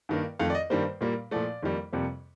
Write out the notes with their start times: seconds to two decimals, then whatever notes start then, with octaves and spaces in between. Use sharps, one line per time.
0.09 G2 D#3 A#3
0.39 F2 D#3 A3 F5
0.50 D5
0.55 D#5
0.70 G2 D#3 G3 A#3 C5
1.01 A#2 G3 A#3
1.31 A#2 F3 A3 D5
1.63 F2 D#3 G3 A#3
1.93 F2 C3 G3 A#3